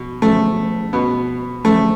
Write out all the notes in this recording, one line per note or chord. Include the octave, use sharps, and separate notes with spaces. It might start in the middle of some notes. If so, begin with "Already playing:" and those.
Already playing: B2
A3
B2 B3
A3